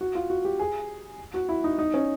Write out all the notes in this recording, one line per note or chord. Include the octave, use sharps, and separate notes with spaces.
F#4
F4
F#4
G4
G#4
F#4
E4
D#4
D#4
C#4